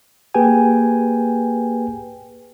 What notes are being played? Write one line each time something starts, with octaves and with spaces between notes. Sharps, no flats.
A#3 G4 G#4 B4 G5 G#5